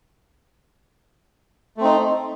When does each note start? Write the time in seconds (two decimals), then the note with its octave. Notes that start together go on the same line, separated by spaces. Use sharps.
1.77 A3
1.81 C4
1.84 D#4